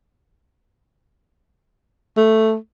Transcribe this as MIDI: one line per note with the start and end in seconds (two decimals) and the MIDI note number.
2.17 2.55 57